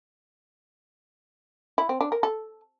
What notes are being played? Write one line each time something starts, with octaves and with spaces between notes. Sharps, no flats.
E4
C4
D4
A#4
A4